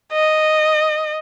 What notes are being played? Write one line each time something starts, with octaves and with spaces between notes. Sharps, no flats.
D#5